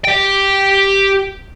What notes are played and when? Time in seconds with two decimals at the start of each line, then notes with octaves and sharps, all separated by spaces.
0.05 G4 G5